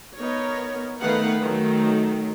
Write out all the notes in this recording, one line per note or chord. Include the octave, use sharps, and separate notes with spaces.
B3 D#4 A#4 C#5
D#3 A3 B3 B4 F5 F#5
D#3 F#3 A3